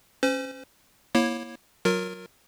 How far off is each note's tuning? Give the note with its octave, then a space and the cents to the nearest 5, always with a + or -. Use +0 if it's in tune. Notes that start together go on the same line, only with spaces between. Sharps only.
C#4 -20 C5 -35
A#3 +25 E4 +0 C#5 -20
F#3 +0 F4 +35 A#4 +0